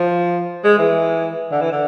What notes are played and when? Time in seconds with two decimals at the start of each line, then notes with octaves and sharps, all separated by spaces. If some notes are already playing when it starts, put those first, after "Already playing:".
Already playing: F3
0.64 G#3
0.79 E3
1.52 D3
1.61 E3
1.72 D3